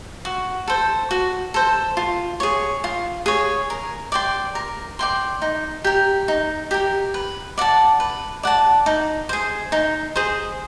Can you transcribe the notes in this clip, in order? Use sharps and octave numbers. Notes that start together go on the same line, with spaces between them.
F#4
A4 C5
F#4
A4 C5
F4
G#4 C#5
F4
G#4 C#5
A#4
D5 G5 C6
A#4
D5 G5 C6
D#4
G4 A#4
D#4
G4 A#4
B4
D5 F#5 A5
B4
D5 F#5 A5
D#4
G#4 C5
D#4
G#4 C5